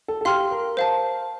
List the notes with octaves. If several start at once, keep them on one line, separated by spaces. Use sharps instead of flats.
A4
A4
G4 F5 C6 F6
A#4
C5 F5 A5